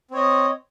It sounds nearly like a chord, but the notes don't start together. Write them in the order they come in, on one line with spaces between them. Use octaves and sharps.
C4 C#5 D#5